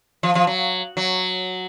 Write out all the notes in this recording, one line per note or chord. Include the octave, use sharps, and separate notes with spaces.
F3
F3
F#3
F#3